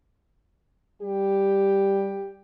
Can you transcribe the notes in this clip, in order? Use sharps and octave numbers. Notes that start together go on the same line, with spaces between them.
G3 G4